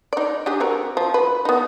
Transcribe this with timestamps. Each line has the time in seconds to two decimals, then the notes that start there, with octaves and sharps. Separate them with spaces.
0.13 D#4 D5
0.46 D4 G4 G#4
0.60 C4 F#4 A#4
0.97 F3
1.14 B4
1.45 B3 D#4